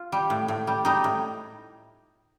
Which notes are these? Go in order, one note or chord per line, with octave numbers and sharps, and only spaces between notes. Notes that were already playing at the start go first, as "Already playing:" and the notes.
Already playing: F4
G3
A2
A2
G3
G3 D#4
A2